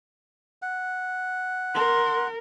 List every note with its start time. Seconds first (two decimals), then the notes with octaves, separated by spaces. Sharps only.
0.62 F#5
1.75 A#4 C6